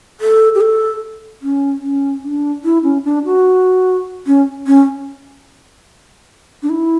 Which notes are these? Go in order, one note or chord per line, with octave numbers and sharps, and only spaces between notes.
A4
G4
A4
C#4
C#4
D4
E4
C#4
D4
F#4
C#4
C#4
D4
E4